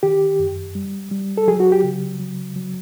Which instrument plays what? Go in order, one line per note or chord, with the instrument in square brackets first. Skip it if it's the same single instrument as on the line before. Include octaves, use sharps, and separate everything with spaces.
[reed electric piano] D#3 G4
F#2
G3
G3
A4
F#3 G#4
F#4
G4
C#3
F#3
F#3